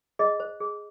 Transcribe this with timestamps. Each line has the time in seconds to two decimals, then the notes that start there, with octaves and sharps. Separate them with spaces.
0.19 G#4 D#5
0.40 C5
0.60 G#4